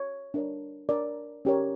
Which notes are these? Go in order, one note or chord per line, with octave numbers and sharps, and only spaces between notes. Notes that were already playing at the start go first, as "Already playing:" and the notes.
Already playing: C#5
D4 A#4 C#5
D4 A#4 C#5 D5
C#4 G4 A#4 C#5